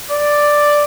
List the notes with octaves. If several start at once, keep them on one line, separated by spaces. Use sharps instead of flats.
D5